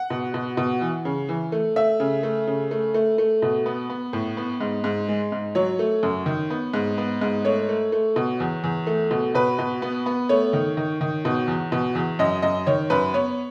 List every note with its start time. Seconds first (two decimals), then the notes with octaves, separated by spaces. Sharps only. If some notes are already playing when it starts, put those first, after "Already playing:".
Already playing: F#5
0.10 B2
0.34 B2
0.57 B2
0.81 E3
1.05 C#3
1.29 E3
1.52 A3
1.76 A3 E5
2.00 C#3
2.23 A3
2.47 C#3
2.71 A3
2.94 A3
3.18 A3
3.42 B2
3.66 B3
3.90 B3
4.13 A2
4.37 B3
4.61 G#2
4.84 G#2
5.08 G#3
5.32 G#2
5.55 F#3 C#5
5.79 A3
6.03 F#2
6.26 D#3
6.50 B3
6.74 G#2
6.98 B3
7.21 G#2
7.45 A3 C#5
7.69 A3
7.92 A3
8.16 B2
8.40 E2
8.64 E2
8.87 A3
9.11 B2
9.35 B2 B4
9.59 B2
9.82 B3
10.06 B3
10.29 A3 C#5
10.53 D#3
10.77 D#3
11.01 D#3
11.25 B2
11.47 E2
11.72 B2
11.95 E2
12.19 F#2 D#5
12.42 F#2 D#5
12.67 D#3 C#5
12.90 F#2 B4
13.14 B3 C#5